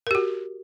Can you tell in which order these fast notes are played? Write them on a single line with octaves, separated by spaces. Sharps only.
A#4 G4 F#4